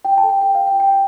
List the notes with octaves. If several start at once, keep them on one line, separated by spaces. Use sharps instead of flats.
F4 G5
A5
A4
G5
F4 G5
F5
F4
G5
F4 G5